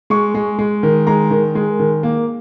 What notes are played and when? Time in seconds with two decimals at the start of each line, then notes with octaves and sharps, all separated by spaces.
0.10 G#3 C#6
0.34 G#3
0.59 G#3
0.83 D#3
1.07 G#3 A#5
1.31 D#3
1.55 G#3
1.79 D#3
2.03 A#3